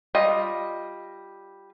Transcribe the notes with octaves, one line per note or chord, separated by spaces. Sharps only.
G3 F4 D#5